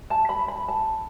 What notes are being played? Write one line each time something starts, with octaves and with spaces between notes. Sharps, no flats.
A5
B5
B5
A5